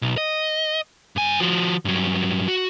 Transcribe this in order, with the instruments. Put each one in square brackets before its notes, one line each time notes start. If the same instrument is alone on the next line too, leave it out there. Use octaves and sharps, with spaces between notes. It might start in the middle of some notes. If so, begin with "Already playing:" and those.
[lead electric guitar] B1
D#5
G2 G#5
F3 F#4
G2 F#3
F#4